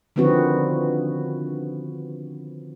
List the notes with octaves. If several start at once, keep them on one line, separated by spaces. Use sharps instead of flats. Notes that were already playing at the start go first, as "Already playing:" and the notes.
D3 D#3 F3 B3 C4 F#4